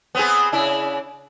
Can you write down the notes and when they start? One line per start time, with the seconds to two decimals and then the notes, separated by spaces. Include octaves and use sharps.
0.15 B3 C4 G#4
0.52 C#3 D4 E4